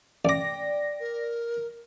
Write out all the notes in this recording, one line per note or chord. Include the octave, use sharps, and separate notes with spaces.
A1 D5 G5 D6 A#6
A#4